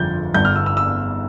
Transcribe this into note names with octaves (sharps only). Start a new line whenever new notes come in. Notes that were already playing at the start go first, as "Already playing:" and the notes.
Already playing: G1 F2 D3 F3 G6 A6
G1 G2 D3 G6
F6
E6
E6
E6